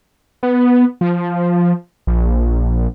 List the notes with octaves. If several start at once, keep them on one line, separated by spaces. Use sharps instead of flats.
B3
F3
A#1